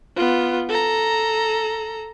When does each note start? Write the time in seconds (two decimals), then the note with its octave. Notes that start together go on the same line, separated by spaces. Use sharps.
0.16 B3 F4
0.69 A4 A#5